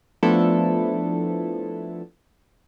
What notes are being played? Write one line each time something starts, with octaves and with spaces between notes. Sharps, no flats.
F3 A3 B3 D4 E4 A4